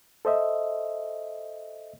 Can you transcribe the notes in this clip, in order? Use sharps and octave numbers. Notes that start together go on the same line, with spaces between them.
A4 C5 D#5 E5